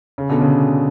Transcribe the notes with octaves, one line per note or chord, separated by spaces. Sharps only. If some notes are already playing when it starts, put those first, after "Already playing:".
C#3
B2 D3
C#3